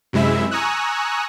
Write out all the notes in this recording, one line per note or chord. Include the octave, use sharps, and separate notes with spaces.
F#2 C3 G#3 E4 E5
G#5 A#5 C#6 D#6 E6 F#6